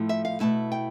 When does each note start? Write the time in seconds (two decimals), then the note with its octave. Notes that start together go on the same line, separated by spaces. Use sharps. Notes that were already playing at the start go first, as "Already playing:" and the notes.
Already playing: A2 F3 A3 E4
0.09 E5
0.25 F5
0.40 B2 A3 E4 A5
0.72 G5